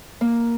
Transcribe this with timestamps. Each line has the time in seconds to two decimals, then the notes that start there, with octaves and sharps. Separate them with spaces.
0.21 A#3